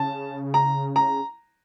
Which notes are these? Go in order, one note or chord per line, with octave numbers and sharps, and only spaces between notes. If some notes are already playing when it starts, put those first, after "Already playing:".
Already playing: C#3 A5
A#5
A#5